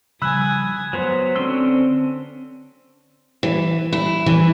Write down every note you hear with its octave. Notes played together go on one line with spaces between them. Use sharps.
C#3 F3 G3 G#5 B5 D#6 E6 F#6
F#3 B3 C5
D3 C4 C#4 C6 E6
E3
E4
E3